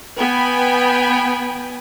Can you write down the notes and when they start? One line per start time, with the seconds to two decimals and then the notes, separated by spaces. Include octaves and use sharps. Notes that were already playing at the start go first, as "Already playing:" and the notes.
0.17 B3 G5 G#5 B5